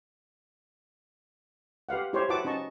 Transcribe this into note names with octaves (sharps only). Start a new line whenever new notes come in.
G4 B4 F5 F#5
E4 G4 C5 C#5 G5 C6
E4 F#4 B4 F#5 A5 D6
C#4 D#4 D#5 A5 C#6